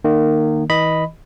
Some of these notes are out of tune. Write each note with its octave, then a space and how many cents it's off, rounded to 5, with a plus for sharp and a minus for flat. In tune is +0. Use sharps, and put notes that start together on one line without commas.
D#3 -25 A#3 -20
E3 -40 D#5 +0 B5 +0